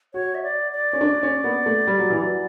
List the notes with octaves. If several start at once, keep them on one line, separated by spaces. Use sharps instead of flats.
F#4 C#5
E5
D5
D5
C#4
D4
C#4
B3
A3
G3
F#3
E3
F#3